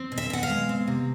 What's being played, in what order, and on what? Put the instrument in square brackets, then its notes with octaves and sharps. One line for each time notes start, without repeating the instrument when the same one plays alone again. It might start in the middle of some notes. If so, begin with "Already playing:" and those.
Already playing: [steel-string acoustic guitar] C4
B2
E5
B2 F#5
F5
G#3
C4
C3